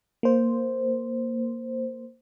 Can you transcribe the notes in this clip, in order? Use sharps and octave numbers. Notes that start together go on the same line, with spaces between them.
A#3 C5